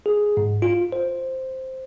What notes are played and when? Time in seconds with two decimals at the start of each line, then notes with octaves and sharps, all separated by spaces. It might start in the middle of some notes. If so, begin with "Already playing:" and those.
0.06 G#4
0.37 G#2
0.62 F4
0.92 C5